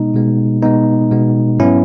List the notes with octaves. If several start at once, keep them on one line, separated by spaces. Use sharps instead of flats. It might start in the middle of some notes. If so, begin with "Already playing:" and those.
Already playing: B2 G#3 B3 D#4
B2 G#3 B3
B2 G#3 B3 D#4
B2 G#3 B3
G#2 F#3 B3 C#4 E4